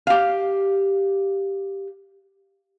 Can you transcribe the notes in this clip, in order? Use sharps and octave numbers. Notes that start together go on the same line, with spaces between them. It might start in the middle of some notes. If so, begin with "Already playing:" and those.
G4 F5